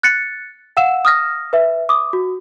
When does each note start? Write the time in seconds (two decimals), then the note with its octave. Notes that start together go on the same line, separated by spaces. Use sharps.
0.03 F#6 A6 C#7
0.77 F5 F#5 E6 E7
1.05 D#6 F6 A#6
1.53 B4 E5
1.89 D6 D#6
2.13 F#4